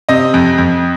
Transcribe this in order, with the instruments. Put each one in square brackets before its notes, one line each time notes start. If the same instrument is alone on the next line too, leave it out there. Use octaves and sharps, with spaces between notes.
[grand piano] C3 D#5
F2
F2